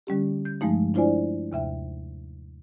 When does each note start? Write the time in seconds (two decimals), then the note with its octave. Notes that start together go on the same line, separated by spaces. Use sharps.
0.07 D3 G3 C#4 G4
0.45 G6
0.61 G2 F3 G#3 A3 D#4
0.94 D4 E4 F4 C5 D5 G#5
1.52 D#2 C3 E5 G5